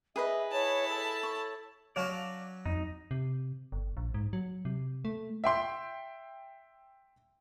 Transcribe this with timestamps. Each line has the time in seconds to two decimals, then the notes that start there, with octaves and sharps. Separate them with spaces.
0.16 G#4 B4 D#5 E5
0.51 E4 C#5 A5
0.88 A4
1.23 C#5
1.96 F#3 C#4 F#4 D5 F5 A5
2.66 F2 D#4
3.11 C3
3.72 G1
3.97 A#1
4.14 G#2
4.33 F#3
4.65 C3
5.05 A3
5.44 E5 G5 C6